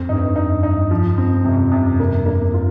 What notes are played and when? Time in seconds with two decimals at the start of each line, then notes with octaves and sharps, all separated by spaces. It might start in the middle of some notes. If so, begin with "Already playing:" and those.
Already playing: F2 C4
0.09 G2 D#4
0.36 D#4
0.63 D#4
0.91 F3
1.18 C4
1.45 F2 C3
1.72 C3
2.00 A#3
2.26 A#3
2.54 F4